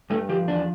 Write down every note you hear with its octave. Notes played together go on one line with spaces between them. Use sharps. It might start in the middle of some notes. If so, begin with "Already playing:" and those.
G2 A3
F3 G4
E2 D4